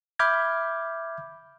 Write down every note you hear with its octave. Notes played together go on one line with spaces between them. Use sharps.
E5 B5 D6 F6 G6 G#6